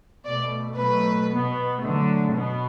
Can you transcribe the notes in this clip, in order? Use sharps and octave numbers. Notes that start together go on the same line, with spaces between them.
B2 A3 D5
B2 F#3 A3 B4
B2 B3
D3 F#3 A3
B2 B3